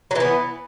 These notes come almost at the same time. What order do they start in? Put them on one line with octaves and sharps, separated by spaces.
F#3 E3 B3